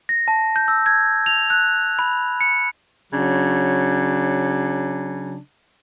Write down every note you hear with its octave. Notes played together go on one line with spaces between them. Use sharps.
A#6
A5
G6
E6
G#6
F7
F#6
B5
C#7
C#3 F#3 D4